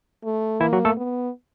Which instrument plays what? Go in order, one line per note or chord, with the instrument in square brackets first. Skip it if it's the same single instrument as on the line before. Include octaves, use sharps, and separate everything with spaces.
[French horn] A3
[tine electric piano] E3 E4 [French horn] A#3
[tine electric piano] F#3 F#4
A3 A4
[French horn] B3